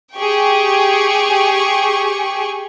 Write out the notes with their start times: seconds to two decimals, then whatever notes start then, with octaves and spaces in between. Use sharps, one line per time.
0.15 G4 G#4 G5 C#6